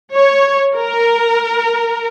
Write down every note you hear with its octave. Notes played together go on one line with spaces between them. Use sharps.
C#5
A#4